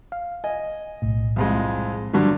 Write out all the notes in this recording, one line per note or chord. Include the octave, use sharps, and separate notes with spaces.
F5
D#5 G#5
B1 A2
C2 F2 G#3
G2 D3 F#3